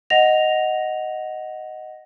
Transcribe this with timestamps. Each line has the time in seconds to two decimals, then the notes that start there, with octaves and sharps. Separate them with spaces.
0.10 D#5 F#5 A#6 F7